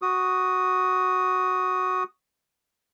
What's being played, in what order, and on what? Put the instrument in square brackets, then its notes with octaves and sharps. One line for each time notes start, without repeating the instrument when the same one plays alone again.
[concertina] F#4 D#6